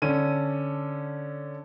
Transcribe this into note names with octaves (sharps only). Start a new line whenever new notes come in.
D3 C#4 A4 D#7